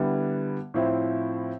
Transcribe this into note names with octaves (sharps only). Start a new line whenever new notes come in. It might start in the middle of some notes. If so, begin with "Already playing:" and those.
Already playing: D3 G3 B3 E4
A2 F3 C4 E4